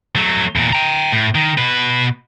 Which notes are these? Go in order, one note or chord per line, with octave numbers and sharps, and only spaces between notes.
F#3 A3
E2 A#2
G5 A#5
A2
D#3
B2 B4